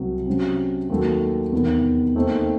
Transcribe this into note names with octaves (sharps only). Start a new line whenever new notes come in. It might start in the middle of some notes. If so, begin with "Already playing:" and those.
Already playing: C2 C3 F#3
C3 F#3 C#4
D#2 D#3 F#3 A3
E2 C3 D#3
D#2 D#3 A3 C4 D#4